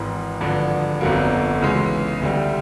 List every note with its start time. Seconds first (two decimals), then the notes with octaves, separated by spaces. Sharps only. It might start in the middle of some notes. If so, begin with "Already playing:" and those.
Already playing: G#1 G#2 E3
0.41 G#1 G2 D3 F3
1.01 G1 F2 D3 F#3 A#3
1.61 C#2 C#3 E3 G#3
2.22 D2 D3 G3